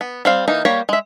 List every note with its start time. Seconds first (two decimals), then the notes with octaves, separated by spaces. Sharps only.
0.01 B3
0.25 G3 C4 F5
0.48 E3 A#3 D#4
0.65 G3 A#3 G4 C#5 B5
0.89 G#3 E5